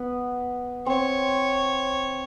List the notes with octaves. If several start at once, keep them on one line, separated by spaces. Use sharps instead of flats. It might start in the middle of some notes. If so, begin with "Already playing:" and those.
Already playing: B3
C4 C#5